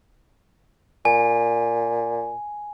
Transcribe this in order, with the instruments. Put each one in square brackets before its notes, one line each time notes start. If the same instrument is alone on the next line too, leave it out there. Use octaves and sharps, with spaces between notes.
[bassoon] A#2 [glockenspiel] G#5